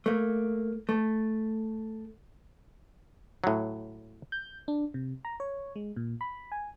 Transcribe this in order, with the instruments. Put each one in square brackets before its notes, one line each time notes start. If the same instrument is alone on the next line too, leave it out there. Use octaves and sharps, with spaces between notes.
[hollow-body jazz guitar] A3 A#3
A3
[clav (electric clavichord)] A2 F#3
[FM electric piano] G6
D4
C3
A#5
C#5
G#3
A#2
B5
G#5